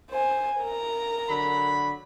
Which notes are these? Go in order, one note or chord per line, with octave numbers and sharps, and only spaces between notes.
C5 G#5
A#4 A#5
D3 F#3 B5